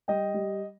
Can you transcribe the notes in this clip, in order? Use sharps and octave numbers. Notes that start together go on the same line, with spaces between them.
G3 D#5 G5
G3